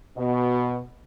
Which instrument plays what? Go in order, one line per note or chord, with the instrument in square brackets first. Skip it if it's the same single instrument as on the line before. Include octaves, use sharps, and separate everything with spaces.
[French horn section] B2